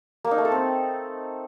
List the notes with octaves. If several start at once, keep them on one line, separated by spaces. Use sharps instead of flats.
A#3
D#4
A3
A4
C4